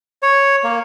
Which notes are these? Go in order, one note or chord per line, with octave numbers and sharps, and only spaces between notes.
C#5
A#3